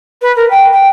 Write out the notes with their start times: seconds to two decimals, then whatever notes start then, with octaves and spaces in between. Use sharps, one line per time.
0.22 B4
0.36 A#4
0.50 G5
0.72 G5